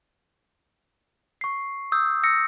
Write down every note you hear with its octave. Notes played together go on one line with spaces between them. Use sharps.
C#6 C7
D#6 E6 G6
D#6 E6 A#6 C#7